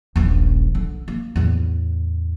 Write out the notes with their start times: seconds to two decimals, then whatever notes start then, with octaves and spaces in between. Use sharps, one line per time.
0.16 D#1 A#1
0.75 D3
1.08 A#3
1.36 E2 A2